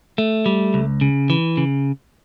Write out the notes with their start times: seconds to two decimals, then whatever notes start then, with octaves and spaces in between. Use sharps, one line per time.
0.18 A3
0.46 G3
0.74 C#2
1.01 C#3
1.30 E3
1.57 C#3